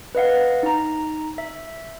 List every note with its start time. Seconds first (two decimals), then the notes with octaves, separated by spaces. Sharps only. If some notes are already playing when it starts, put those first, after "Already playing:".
0.15 B4 D#5 F5 F#5
0.63 D#4 A#5
1.38 E5